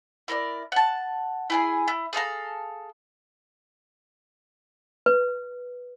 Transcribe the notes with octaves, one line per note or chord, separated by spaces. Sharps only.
E4 A#4 C5 D5
F#5 A5
E4 G#4 G#5
E4
G#4 A4 F5 A#5
B4